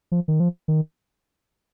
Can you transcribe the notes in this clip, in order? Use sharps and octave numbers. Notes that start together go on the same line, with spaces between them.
F3
D#3
F3
D#3